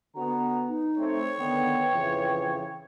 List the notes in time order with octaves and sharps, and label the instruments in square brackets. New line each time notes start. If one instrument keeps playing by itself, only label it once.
[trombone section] D3 B3 F#4 [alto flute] A#5
[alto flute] D#4
[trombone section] A3 C4 [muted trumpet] C#5
[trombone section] D3 D#3 B3 [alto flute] G5
[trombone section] F2 C#3 E3